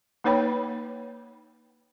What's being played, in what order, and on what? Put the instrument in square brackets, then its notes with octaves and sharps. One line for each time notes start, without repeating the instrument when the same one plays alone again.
[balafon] A#3 D#4 B4 C#5 G5 B5